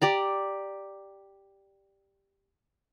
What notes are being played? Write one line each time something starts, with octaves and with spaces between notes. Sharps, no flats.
G4 D5 A#5